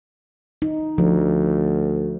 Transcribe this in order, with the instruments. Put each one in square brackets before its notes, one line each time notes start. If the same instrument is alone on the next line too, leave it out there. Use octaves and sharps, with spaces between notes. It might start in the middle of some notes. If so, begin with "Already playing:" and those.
[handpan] D#4
[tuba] D2 [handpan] F3